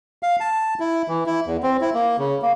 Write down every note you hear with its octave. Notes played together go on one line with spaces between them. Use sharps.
F5
A5
E4
E3
E4
E2
C4
E4
A#3
C#3
A#3